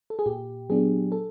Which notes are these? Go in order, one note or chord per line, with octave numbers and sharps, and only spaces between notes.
A4
G#4
A#2 G4
F#3 B3 D4 G#4
A4